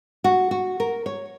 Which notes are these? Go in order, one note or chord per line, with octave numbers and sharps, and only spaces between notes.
F#4
F#4
A#4
C#5